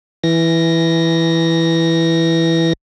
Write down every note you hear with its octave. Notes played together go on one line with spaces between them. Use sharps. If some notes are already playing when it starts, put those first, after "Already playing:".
E3 A#6